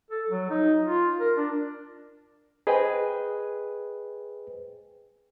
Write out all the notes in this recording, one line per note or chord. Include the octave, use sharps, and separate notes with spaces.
A4
F#3
D#4
F4
A#4
D4
G#4 B4 C5 D#5 G5 G#5